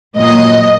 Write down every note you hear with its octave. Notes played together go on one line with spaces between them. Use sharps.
A#2 F#3 D#5